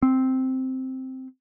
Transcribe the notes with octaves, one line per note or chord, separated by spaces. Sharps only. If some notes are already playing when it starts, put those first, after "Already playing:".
C4